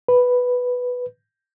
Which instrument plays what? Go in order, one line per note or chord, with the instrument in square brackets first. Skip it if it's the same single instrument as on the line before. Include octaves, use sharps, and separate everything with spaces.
[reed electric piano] B4